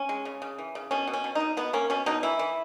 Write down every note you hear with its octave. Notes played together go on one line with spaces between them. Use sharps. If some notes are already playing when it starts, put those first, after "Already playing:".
Already playing: C#4
G#3
C#3
C#3
E3
C#3
B2 C#4
B2
C#4
B2
B2 D#4
B2 B3
A#3 C#4
B2 C#4
B2 D#4
E3 E4
E3